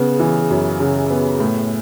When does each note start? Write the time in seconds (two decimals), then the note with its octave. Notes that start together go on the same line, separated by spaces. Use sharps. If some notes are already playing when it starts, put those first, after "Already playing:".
Already playing: C#3 B3
0.20 E3
0.50 F#2
0.80 C#3
1.10 B3
1.40 A2